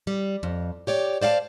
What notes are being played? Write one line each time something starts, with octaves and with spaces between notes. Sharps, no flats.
G3
F2
G4 C#5 D5
C5 D5 F5 F#5 A5